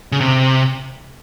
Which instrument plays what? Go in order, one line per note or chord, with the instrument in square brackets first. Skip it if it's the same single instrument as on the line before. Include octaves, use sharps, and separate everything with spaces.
[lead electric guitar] C#3
C3